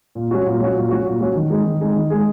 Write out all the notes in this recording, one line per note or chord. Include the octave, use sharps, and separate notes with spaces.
A#2
F#3 C#4 F#4
A#2
F#3 C#4 F#4
A#2
F#3 C#4 F#4
A#2
F#3 C#4 F#4
D#3
G#3 D#4 G#4
D#3
G#3 D#4 G#4
D#3
G#3 D#4 G#4